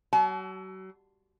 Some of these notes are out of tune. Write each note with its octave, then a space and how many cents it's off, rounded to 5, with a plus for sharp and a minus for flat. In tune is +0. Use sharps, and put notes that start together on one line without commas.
F#3 +35 A5 -45